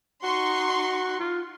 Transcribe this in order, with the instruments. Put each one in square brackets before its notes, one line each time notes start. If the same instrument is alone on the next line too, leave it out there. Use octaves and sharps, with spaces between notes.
[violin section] D#4 C6 C#6 [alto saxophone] F#4
[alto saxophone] F4